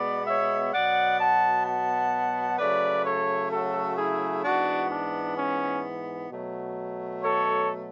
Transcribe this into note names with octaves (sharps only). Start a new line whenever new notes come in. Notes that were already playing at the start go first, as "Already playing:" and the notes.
Already playing: B2 G#3 B3 B4 D5
C#5 E5
B2 F#3 B3 D5 F#5
F#5 A5
F#5 A5
C#3 F#3 A3 B4 D5
A4 C#5
F#4 A4
E4 G#4
G#2 E3 B3 D4 F#4
D4
C#4
B2 F#3 A3
A4 C#5